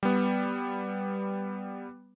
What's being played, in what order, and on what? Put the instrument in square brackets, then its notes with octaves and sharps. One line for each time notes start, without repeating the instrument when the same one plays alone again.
[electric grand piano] G3 B3